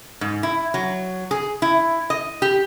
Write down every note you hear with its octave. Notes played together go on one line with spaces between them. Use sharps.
G#2
E4
F#3
G#4
E4
D#5
G4